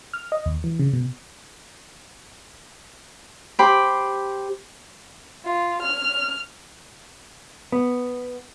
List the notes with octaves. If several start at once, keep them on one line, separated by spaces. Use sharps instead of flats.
F6
D#5
D#2
E3
C#3
B2
G4 C5 G5 B5
F4
F6
B3